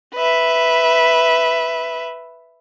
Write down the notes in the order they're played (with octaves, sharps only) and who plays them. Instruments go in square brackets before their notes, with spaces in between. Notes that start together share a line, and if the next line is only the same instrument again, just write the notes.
[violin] B4 E5